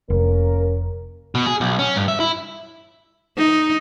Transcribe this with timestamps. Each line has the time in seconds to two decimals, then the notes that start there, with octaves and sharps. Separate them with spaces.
0.10 F1 A#3 C#4 A#4
1.35 B2
1.46 G#4
1.61 B1
1.79 C#4
1.96 G2
2.08 E5
2.20 E4
3.38 D#4